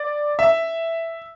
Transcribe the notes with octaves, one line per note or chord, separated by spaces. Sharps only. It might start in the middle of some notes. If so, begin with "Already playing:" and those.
Already playing: D5
E5